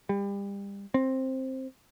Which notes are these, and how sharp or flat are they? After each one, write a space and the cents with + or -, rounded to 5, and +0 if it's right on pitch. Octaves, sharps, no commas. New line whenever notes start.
G3 +30
C4 +10